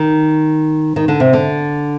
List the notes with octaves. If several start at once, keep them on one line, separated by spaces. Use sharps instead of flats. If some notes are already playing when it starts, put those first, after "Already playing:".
Already playing: D#3
D#3
D3
C3
D3